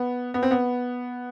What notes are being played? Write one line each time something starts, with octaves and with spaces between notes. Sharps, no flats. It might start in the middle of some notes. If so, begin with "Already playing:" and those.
Already playing: B3
B3
C4
B3